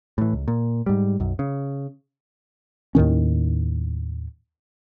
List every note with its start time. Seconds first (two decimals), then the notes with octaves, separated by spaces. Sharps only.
0.18 A2 E3
0.33 C#2
0.48 A#2
0.86 G#2 G3
1.20 B1 F#2
1.39 C#3
2.95 D#2 A2 D#3 C#4